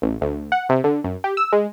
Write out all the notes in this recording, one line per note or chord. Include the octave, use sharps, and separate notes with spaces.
A1
D2
F#5
C3
D3
F#2
G4
E6
G#3